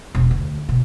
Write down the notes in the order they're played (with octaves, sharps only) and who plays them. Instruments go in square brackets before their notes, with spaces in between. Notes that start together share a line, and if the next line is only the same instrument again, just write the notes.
[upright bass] E1
D2
B2